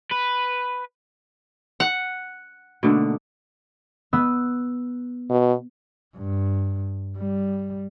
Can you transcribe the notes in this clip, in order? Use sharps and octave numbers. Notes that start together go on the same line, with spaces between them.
B4
F#5
B2 D3 A3 A#3 D4 D#4
B3 E6
B2
G2
G3